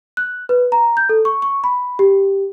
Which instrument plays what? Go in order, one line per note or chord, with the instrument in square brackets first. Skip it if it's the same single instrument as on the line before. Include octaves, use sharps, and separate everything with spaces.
[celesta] F#6
B4
A#5
G6
A4
C#6
C#6
B5
G4